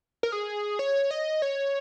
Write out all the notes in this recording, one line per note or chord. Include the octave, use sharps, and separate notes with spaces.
A#4
G#4
C#5
D#5
C#5